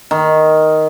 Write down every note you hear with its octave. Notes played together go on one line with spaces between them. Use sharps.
D#3